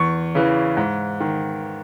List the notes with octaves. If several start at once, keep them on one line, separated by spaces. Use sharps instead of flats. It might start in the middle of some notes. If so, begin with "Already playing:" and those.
Already playing: E2 C#6
C#3 E3
G#2
D#3